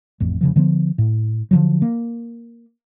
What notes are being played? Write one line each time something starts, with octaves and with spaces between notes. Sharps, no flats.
A1 F2
F1 C#3 F3
D3 F3 A#3 B3
A2
D3 F3 F#3
A#3